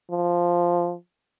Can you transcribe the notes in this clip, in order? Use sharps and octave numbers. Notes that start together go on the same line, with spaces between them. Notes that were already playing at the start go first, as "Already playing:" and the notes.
F3